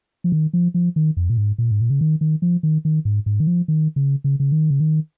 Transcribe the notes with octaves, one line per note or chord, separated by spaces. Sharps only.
F3
D#3
F3
F3
D#3
F2
A#2
G#2
A#2
G#2
A#2
C#3
D#3
D#3
F3
D#3
D#3
G#2
G#2
D#3
F3
D#3
C#3
C#3
C#3
D#3
C#3
D#3